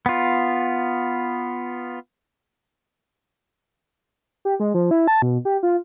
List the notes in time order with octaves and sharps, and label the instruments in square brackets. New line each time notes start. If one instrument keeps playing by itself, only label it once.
[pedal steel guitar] B3 F4
[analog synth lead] G4
G#3
F3
E4
A5
B2
G4
F4